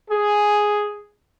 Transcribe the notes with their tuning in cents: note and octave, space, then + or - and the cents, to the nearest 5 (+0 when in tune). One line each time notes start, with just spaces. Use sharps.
G#4 +0